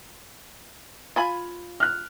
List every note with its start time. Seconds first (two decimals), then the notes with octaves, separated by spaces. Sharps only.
1.16 F4 G#5 B5
1.80 F6 F#6